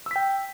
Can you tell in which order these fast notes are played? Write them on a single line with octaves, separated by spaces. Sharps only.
E6 B6 G5